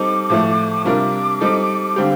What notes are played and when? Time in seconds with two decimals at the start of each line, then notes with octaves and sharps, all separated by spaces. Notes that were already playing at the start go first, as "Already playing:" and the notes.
Already playing: G3 C4 D#4 A4 D6
0.30 A2 F3 A3
0.85 C3 G3 D4 F4 A#4 D6
1.41 G3 C4 D#4 A4
1.96 D3 G3 C4 G4 F5